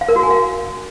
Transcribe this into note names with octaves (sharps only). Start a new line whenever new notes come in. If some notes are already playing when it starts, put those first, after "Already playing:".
F5
A#4
F#4
G#5
F5